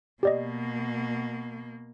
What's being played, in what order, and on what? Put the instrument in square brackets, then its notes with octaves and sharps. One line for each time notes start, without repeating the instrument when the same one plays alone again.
[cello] B2 A#3 [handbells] G4 D5 D#5